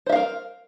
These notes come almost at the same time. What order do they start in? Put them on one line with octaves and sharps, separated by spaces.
C5 E5 F5 A#4